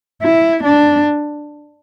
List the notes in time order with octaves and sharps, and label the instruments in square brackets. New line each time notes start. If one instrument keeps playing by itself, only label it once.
[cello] E4
D4